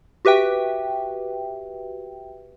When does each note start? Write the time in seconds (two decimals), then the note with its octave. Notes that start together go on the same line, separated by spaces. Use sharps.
0.25 F#4 G4 B4 E5 G5